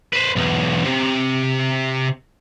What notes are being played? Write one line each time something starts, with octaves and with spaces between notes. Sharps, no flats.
B4 C5
B1 E2
C3